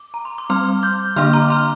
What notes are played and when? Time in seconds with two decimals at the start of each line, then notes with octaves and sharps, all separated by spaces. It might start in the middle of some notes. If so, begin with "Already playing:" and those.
Already playing: D6
0.14 A#5
0.25 C6
0.38 D6
0.50 G3 C4 C6 F6
0.83 D6 G6
1.16 D3 A#3 D4 C6 F6
1.33 A#5 D6
1.50 C6 F6